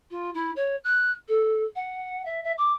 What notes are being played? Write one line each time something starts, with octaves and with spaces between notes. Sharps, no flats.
F4
E4
C#5
F#6
A4
F#5
E5
E5
D6